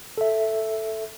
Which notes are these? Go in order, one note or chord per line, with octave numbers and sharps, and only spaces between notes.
A4 E5